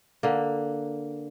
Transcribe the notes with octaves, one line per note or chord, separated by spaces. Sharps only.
D3 A#3